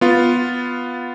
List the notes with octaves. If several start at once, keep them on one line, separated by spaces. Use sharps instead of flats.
B3 F4